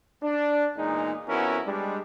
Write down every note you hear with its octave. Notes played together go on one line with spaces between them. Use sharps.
D4
E2 A#2 G#3 D#4
F2 B3 C#4 E4 F#4 A#4
G3 G#3 D4